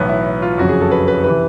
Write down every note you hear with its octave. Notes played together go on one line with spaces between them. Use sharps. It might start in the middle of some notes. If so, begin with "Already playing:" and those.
Already playing: B1 A2 E3 B3
E4
E4
F4
F#1 F2 C#3 F#3 F#4
G#4
A4
B4
B4
C3 E3 B4